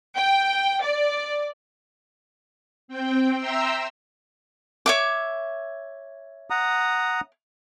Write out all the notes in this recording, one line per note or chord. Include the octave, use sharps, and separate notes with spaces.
G5
D5
C4 G5
E5 G5 A#5 C6 E6
C#5 E5 D6
F#5 A#5 D#6